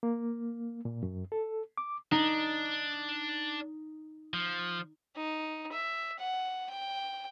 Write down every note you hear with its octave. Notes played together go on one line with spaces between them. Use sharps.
A#3
A#2
F#2
A4
D6
D4 D#4
F3
D#4
E5
F#5
G5